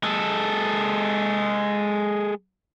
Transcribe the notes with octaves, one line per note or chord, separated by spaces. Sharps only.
G#3 A4